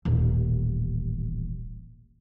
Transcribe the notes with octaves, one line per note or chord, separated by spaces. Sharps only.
D#1 A1